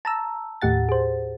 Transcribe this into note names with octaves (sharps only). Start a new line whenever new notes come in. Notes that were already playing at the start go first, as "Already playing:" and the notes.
A5 A#5 E6
D#2 A2 G4 F#5 A6
G#4 C5